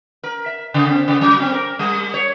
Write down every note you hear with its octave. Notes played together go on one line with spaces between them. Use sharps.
A#4
E5
C#3
C4
C#3
F#3
C4
A#4
G3
C#5